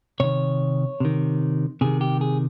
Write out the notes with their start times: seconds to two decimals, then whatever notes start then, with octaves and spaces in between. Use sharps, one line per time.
0.20 C3 D#3 C#5
1.00 C3 D#3
1.81 C3 D#3 G#4
2.01 G4
2.21 G#4